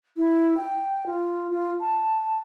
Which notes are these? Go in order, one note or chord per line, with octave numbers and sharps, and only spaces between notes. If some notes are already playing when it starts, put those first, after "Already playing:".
E4
G5
F4
F4
A5